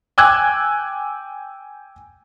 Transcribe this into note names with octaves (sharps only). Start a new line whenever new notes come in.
G5 G#5 D6 E6 F#6 G#6